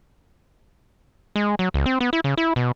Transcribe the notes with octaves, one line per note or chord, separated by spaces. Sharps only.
G#3
F#3
C#2
C4
B3
E4
C#3
E4
B2